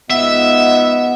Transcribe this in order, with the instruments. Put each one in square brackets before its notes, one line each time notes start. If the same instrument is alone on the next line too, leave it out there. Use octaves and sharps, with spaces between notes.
[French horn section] G#2 F4 D#5 [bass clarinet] B3 [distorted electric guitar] E5